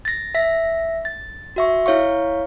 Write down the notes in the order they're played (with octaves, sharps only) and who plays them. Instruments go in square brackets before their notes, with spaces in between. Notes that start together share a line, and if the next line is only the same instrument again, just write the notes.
[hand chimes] A6 A#6
E5 A#6 B6
A6
F#4 E5 C#6
E4 C#5 F5 C#6